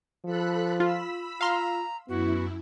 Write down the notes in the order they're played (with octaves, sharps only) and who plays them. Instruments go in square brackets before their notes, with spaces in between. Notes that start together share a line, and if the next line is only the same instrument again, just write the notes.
[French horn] F3 [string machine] A4 B5 F#6
[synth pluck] F4 [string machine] B5 E6 B6
[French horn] F4 [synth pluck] F5 C6 F6 [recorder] A#5
[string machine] F#2 E4 [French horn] B3 [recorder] F#4